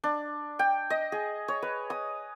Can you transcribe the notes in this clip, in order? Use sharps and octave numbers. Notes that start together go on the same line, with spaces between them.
D4
G5
D#5
G#4
C#5
B4
D#6